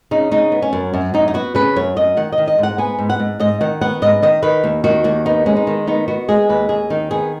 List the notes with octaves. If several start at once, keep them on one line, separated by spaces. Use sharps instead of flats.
C#3 D#4
C#3 D#4
B3
C#4
F#2
F#2
F#2 D#4
D#4
B3 F#4
C#3 B4
F#2 C#5
F#2 D#5
D#3 F#5
D#5
D#3
D#5
G#2 F#5
B3 G#5
G#2
F#5
G#2
G#2 D#5
D#3 F#5
B3 F#5
G#2 D#5
D#3 D#5
D#3 B4
D#2
D#3 F#4
D#2 F#4
B3 D#4
G#3 C#4
D#4
D#3
B3 D#4
B3 F#4
G#3 G#4
D#2 B4
D#2 G#4
D#3 D#4
B3 G#4